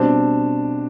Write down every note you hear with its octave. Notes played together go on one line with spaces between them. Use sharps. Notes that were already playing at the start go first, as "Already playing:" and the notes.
Already playing: B2 G3 C4 D4